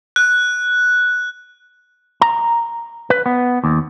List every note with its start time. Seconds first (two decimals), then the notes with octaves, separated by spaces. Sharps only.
0.16 F#6
2.21 A#5
3.10 B4
3.26 B3
3.64 D#2